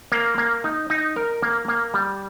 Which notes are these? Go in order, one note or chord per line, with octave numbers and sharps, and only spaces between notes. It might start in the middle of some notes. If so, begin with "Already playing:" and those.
A#3
A#3
D#4
D#4
A#4
A#3
A#3
G3